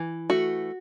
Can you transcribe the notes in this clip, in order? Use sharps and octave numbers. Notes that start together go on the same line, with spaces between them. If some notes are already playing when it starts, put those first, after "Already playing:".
Already playing: E3
A3 F#4